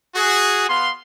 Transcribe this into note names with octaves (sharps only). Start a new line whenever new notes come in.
F#4 G#4
B3 F5 C6